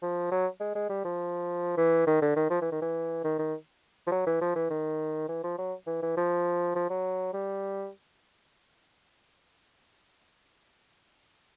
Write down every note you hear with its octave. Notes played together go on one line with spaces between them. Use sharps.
F3
F#3
G#3
G#3
G3
F3
E3
D#3
D3
D#3
F3
E3
D#3
E3
D#3
D#3
F3
F#3
E3
F3
E3
D#3
E3
F3
F#3
E3
E3
F3
F3
F#3
G3